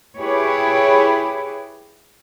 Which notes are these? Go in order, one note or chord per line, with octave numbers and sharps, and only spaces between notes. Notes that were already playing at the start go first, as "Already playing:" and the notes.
E4 G4 G#4 B4 C#5